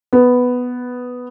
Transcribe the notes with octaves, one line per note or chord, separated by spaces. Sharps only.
B3